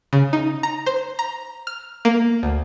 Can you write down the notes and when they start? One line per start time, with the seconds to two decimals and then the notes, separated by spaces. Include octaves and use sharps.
0.13 C#3
0.33 D#4
0.63 A#5
0.86 C5
1.19 A#5
1.67 F6
2.05 A#3
2.43 D2